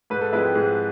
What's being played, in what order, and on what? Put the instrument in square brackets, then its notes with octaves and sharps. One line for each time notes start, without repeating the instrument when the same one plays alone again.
[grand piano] G#2 [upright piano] B4
[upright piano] A4
[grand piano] F3 G#3 C4 E4 [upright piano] B4
[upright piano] G4
[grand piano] G#2 [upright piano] G#4